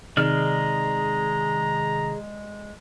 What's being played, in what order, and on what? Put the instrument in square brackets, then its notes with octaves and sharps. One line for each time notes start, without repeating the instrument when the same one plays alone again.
[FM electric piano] C3 D#3 [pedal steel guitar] G#3 D5 F6 [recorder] G#4 [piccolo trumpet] A#5